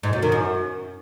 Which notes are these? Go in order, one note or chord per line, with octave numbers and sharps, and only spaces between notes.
G#2
F#2
D#3
F#2